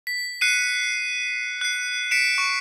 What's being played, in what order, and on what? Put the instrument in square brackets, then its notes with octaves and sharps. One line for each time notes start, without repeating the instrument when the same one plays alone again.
[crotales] B6
F#6 C7 C#7 D#7
F#6 C7
B6 C#7 D7 E7
C#6